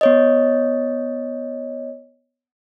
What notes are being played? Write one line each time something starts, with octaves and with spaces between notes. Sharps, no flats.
B3 C#5 D#5